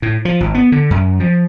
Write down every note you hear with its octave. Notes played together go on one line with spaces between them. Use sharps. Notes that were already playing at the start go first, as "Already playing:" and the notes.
A2
F3
G#1
B3
D3
F#2
F3